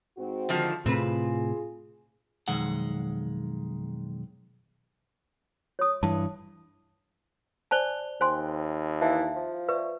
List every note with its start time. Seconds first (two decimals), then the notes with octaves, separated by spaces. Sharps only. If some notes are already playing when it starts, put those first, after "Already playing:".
0.17 G#2 C4 F#4
0.49 D3 D#3 F3
0.86 A2 C3 C4 F4 G#4 B4
2.48 B1 F2 D#3 G#3 F#5
5.79 C#5 D#6
6.03 G2 E3 A5
7.71 C5 D5 G#5 A5 F7 G7
8.21 D#2 C5 G5 G#5 C6
9.01 E3 E5 F5 A5
9.36 F3
9.69 B4 D5 E5 C#6